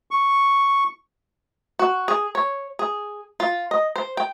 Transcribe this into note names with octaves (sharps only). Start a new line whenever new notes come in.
C#6
F#4
G#4
C#5
G#4
F4
D#5
C5
G5